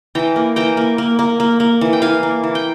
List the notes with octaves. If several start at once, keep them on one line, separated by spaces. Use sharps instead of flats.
E3 G5 A#5
A#3
E3 G5 A#5
A#3
A#3
A#3
A#3
A#3
E3
G5
E3 F5 G#5
A#3
E3
G5